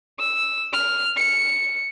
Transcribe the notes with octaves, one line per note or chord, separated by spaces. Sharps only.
E6
F6
C#7